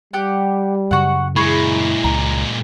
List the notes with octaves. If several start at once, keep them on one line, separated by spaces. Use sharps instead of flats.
G3 G4 F#5
F#2 C#3 F#4 F#5
A#2 G#3 E4 G#4 B5 C#6
C#2 C#3 A#5